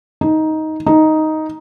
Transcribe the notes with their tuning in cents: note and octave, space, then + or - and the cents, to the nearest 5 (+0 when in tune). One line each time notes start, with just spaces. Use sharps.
D#4 +10
D#4 +5